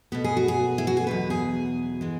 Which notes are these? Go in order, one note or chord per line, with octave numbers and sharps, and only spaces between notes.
B2 B3 B4
G#4
F#4
G#4
E4
F#4
G#4
E2 B2 F#3 B4
G#4
E3 G#3